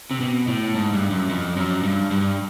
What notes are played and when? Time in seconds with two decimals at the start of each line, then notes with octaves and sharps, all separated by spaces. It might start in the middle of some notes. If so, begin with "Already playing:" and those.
0.11 C3
0.21 B2
0.48 A2
0.75 G#2
0.93 G2
1.10 F#2
1.29 F2
1.57 F#2
1.83 G2
2.11 G2